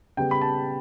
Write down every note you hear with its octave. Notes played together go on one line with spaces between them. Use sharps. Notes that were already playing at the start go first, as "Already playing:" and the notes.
C#3 G3 B3 G5
B5
A5